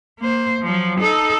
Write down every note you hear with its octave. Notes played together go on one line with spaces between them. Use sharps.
A#3 C5
F3 F#3
D#4 A4